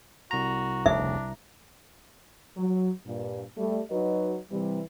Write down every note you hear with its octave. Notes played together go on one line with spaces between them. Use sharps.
C2 F#4 A#5
F1 D2 C#3 D4 E5
F#3
G2 A#2
G3 A3
F#3 D#4 F#4 B4 D#5
C3 E3 G3